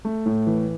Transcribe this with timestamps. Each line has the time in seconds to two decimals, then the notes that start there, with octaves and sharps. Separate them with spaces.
0.05 A3
0.26 A2
0.47 E3